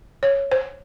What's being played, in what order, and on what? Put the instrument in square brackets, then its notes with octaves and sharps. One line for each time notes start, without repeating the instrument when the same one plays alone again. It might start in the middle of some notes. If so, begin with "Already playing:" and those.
[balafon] C#5
C5